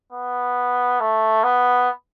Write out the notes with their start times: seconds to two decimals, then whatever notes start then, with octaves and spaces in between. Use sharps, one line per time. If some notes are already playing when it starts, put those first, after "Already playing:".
0.12 B3
1.00 A3
1.43 B3